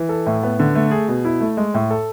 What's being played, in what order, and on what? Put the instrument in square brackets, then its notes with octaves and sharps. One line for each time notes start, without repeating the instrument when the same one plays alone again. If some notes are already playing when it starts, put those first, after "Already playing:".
Already playing: [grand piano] E3
A4
A2
B3
D3
A3
G#4
B2
E4
A3
G#3
A2
A4